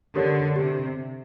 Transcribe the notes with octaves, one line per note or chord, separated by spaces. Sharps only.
D3 G4 A#4 C#5
C3 G4